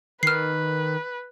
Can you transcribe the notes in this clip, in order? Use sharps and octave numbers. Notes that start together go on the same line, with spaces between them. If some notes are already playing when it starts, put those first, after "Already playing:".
D#3 B4 F6 C7